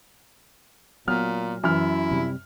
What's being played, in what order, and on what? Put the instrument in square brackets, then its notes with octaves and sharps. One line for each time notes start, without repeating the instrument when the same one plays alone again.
[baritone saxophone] A#2 [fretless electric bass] F#3 [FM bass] B3 [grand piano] F6
[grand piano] F#2 F6 [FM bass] E3 [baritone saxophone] E4
[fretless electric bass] C3 G3